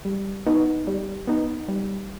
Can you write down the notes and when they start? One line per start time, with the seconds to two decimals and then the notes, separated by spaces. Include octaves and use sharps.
0.05 G3
0.47 B3 D#4
0.87 G3
1.28 B3 D#4
1.68 G3